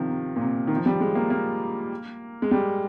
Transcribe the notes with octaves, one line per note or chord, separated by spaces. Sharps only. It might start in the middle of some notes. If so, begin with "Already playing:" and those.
Already playing: C3 D#3 F3
C3
A#2
C3
D#3
F3
G3
G#3
A#3
A#3
G#3
G3